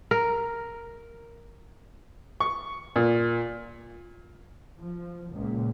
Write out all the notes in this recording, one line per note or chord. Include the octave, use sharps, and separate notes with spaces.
A#4
C#6
A#2
F3
C#2 A#2